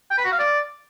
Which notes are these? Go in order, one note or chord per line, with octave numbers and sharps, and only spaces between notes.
G5
B4
F#4
F5
D5